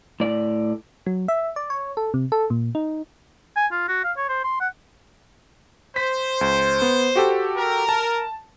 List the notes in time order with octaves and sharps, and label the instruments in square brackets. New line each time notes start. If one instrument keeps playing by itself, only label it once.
[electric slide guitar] A2 D5
[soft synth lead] F#3
E5
D5
C#5
A4
C3
A4
A#2
D#4
[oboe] G#5
F4
F#4
F5
C#5
C5
C6
F#5
[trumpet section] C5 [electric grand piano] B6
[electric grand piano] C#2
B3
F#4 G4 A4
[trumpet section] A#4
[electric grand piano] A5